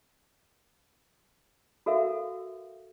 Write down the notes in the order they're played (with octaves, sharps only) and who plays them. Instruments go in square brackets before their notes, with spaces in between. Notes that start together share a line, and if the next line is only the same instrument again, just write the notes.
[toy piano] F#4 A4 A#4 E5 F5